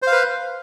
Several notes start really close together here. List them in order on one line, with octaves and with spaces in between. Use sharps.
C5 F5 B4